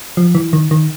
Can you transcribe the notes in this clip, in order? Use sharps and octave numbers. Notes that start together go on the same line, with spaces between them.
F3
E3
D#3
D#3